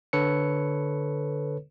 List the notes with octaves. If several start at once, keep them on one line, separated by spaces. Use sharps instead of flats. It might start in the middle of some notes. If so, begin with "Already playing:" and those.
D3 A4 B4 C#5 C#7